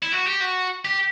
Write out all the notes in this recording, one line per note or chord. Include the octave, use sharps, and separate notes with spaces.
E4
F#4
G4
F#4
G4